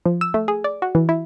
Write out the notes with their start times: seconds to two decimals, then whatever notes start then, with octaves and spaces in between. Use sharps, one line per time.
0.06 F3
0.21 E6
0.34 A3
0.48 G#4
0.64 D5
0.82 F#4
0.95 E3
1.09 E4